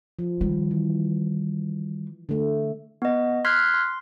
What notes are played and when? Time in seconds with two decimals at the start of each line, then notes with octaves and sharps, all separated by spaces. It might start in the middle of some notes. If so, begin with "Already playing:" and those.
0.19 F3
0.41 D#3 G3
0.71 E3
2.29 D3 A3
3.02 B3 D#5
3.45 C6 F6 F#6 G#6 B6 C7
3.74 C6